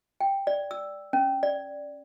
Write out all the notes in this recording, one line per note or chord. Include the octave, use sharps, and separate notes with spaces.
G5
D5
E6
C#4
D5